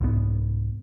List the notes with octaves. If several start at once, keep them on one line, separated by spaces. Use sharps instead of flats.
C2 G#2 B3